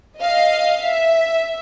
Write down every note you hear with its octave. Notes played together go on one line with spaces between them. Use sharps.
D#5 F5
E5